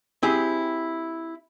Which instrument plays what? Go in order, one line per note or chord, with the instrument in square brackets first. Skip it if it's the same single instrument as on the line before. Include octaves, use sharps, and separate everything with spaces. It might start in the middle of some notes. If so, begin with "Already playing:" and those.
[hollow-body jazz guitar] C4 E4 G4 G#4